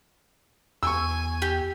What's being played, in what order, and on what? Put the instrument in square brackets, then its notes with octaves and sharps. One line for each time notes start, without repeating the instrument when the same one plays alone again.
[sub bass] E2 [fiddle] G#5 [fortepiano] C#6 E6
[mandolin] G4